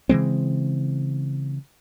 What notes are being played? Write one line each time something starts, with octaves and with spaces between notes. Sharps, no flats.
C#3 E3 G#3 C4